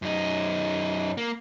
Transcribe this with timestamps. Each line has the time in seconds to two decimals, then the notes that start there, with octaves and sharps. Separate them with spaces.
0.02 F#2 D#4
1.17 A#3